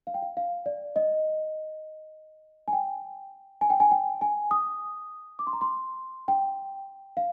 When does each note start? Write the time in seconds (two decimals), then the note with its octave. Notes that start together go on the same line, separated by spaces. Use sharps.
0.07 F5
0.14 G5
0.22 F5
0.37 F5
0.66 D5
0.96 D#5
2.68 G#5
2.73 G5
3.61 G#5
3.70 G5
3.80 G#5
3.91 G5
4.21 G#5
4.51 D#6
5.39 D6
5.47 C6
5.53 A#5
5.61 C6
6.28 G5
7.17 F5